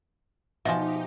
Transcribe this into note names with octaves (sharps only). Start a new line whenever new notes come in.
B2 F3 D#4 G4 E5 G#5